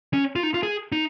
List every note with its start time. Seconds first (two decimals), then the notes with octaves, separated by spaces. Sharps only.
0.14 C#4
0.36 F4
0.43 D#4
0.54 F4
0.63 G#4
0.92 D#4